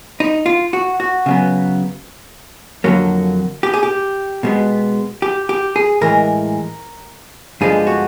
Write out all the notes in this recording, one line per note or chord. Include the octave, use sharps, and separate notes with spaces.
D#4
F4
F#4
F#4
C#3 F#3 B3
F2 D3 F#3 A#3
G4
G#4
G4
B2 G#3 B3
G4
G4
G#4
A2 E3 G#3 A#4
G2 D3 F3 G#3 B3 G#4
F#4